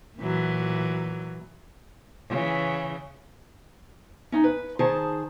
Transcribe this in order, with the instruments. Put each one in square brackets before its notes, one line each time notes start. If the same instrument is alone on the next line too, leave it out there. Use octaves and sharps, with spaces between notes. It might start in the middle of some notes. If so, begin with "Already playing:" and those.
[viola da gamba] A#2 E3 F#3
C#3 E3
[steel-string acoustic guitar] C#4 D#4
B4
D#3 G#4 C5 A5